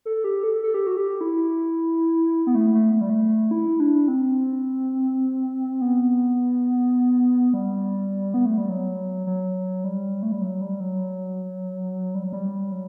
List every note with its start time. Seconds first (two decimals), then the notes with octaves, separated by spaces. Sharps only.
0.05 A4
0.24 G4
0.44 A4
0.63 A4
0.74 G4
0.87 F#4
0.97 G4
1.21 E4
2.47 B3
2.55 A3
2.74 A3
2.93 A3
3.01 G3
3.10 A3
3.51 E4
3.80 D4
4.08 C4
5.81 B3
7.54 G3
8.34 B3
8.46 A3
8.58 G3
8.69 F#3
9.27 F#3
9.84 G3
10.23 A3
10.32 G3
10.41 F#3
10.61 G3
10.80 F#3
12.15 G3
12.24 F#3
12.32 G3
12.72 F#3